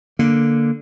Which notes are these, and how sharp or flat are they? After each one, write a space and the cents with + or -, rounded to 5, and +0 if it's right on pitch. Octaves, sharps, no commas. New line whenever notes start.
D3 +0 A#3 +0